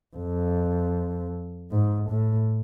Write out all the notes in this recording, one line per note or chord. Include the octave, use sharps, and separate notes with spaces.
F2
G#2
A2